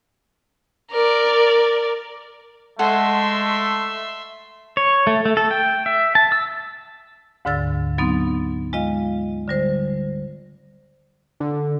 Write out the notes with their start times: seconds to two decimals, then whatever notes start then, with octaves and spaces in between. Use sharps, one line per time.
0.91 A#4 D5
2.79 G#3 A3 A4 E5 F#5 C6
4.77 C#5
5.07 A3
5.25 A3
5.37 A4
5.51 G5
5.86 E5
6.15 A5
6.32 E6
7.45 D2 G#2 D3 E6 A6
7.98 F#3 B3 C4 D#4
8.73 G#3 F4 D#5 F5
9.48 D3 G3 C5
11.40 D3